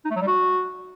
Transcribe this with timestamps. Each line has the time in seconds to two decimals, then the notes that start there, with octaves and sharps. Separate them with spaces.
0.05 D#4
0.11 A3
0.16 F#3
0.22 G3
0.28 F#4